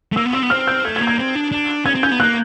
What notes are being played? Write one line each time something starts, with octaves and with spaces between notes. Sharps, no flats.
A3
A#3 E6
B3
C4 E6
B3
C4 F6
G6
A3 G#6
G#6
A#3
G#6
C4
D4
D4
C#4 G#6
C4
C#4 G6
B3
A#3 F#6